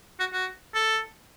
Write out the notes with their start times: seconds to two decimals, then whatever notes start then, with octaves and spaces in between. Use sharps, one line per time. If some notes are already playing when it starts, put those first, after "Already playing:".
0.20 F#4
0.33 F#4
0.74 A4